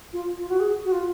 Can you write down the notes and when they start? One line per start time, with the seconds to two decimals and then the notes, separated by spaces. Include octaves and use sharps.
0.13 F4
0.39 F4
0.49 F#4
0.60 G#4
0.84 F#4
0.92 F4